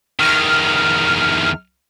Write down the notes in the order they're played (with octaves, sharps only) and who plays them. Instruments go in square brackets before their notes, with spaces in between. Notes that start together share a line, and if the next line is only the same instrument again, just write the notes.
[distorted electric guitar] E2 D#3 [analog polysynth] F6